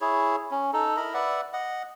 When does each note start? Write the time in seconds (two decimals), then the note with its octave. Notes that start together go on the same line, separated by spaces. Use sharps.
0.01 E4 G#4 C#5
0.51 C#4
0.73 D#4 A4
0.97 E4 A#4 D#5 B5
1.14 B4 D5 E5 F#5
1.53 D#5 F#5